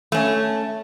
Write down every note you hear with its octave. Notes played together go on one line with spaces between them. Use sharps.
A3 C#4